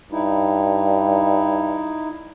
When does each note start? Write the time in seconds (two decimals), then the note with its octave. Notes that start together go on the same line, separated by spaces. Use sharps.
0.12 G2 D#4 E4